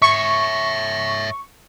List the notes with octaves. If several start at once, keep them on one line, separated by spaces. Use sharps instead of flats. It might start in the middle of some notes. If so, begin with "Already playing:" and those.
C#5 E5 C#6